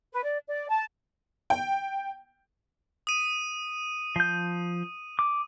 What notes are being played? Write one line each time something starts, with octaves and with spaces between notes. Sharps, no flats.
B4
D5
D5
A5
G5
D#6 D#7
F3 G6
D6